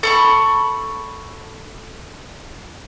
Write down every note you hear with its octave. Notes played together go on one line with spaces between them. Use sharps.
A4 B5 C#6